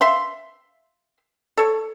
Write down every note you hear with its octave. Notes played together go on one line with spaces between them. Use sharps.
E5 F5 C6
A4 C#5